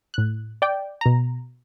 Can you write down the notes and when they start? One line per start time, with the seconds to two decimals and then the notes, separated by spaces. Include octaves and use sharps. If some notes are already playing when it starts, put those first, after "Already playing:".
0.14 A2 F#6
0.62 D5 G5
1.01 B2 A#5